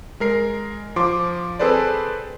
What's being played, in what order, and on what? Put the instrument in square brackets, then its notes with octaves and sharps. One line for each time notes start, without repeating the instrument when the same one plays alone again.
[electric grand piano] G#3 A#4 C7
F3 C6 D6
C4 G#4 A4 B4 C5 D5